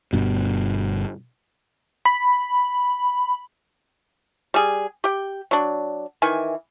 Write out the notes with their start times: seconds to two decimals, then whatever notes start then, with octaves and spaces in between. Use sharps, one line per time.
0.13 G1 G2 B2
2.05 B5
4.54 G3 G#4
5.04 G4 G5
5.51 F#3 D4
6.22 D#3 E3 G#5